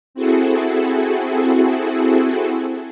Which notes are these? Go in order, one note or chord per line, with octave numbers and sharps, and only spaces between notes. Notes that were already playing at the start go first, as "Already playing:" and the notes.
C4 E4 F#4 G#4 A4